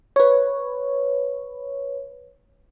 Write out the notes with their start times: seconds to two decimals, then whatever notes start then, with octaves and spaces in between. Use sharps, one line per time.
0.16 B4 C#5